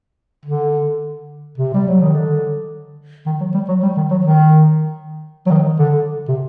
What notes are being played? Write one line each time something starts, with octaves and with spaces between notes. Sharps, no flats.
D3
C3
G3
F#3
D#3
D3
D#3
F#3
G3
F#3
G3
D#3
F#3
D#3
F#3
D#3
D3
C3